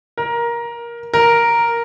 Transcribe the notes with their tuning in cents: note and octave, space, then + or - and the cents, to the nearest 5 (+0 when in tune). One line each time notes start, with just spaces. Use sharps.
A#4 +15
A#4 +0